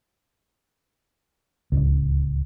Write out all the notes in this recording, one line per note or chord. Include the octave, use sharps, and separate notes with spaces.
D1 G1 C#2